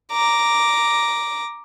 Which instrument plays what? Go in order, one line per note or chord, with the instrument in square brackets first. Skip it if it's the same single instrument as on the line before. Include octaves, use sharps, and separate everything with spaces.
[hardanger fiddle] A#5 D6